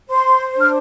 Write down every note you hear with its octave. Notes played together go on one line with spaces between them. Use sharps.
C5 C6
D4
F6